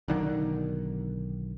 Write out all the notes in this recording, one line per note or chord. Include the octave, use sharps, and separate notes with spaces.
B1 D3 D#3